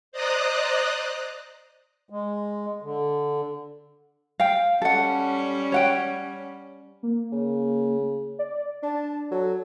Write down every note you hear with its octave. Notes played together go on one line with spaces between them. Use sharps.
C5 D5 D#5 A#5 D#6 F#6
G#3
D3
F5 G5
G3 C#4 A4 F#5
C#5 F#5 G5
A#3
C#3
D5
D4 A5
F#3 A4